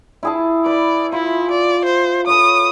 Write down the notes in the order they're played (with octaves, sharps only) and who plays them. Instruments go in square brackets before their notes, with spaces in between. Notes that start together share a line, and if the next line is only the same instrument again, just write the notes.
[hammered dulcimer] E4 G#4 A5
[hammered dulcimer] B4 [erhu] D5
[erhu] E4 [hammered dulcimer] F4
[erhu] D5
C5
[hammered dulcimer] A4 B4 C#5 [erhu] D#6